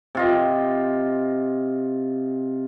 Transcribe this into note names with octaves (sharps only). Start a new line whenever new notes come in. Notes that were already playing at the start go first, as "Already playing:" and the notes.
C3 F4 D#5